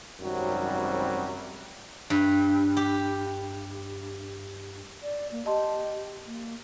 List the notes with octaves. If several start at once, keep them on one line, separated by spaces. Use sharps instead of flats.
G#1 F#2 C3 F#3 G3
G2
G4
D5
A#3
G4 D#5 A5 C6
A#3